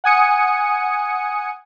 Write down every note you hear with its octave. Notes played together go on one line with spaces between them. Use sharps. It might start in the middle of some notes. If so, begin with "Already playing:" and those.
F#5 G#5 D#6 C#7